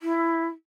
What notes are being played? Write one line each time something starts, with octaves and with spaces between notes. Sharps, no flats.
E4